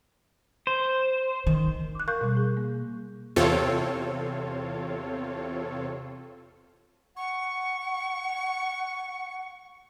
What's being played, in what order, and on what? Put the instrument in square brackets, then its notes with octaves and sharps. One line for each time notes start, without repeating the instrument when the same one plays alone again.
[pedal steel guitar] C5
[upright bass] D#3
[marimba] D6 F#6
A#4 F5 C#6 F#6 G6
B2 G3
G#4
A#3
[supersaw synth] E2 C3 C4 F4 A4 C#5
[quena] F#5 [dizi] C#6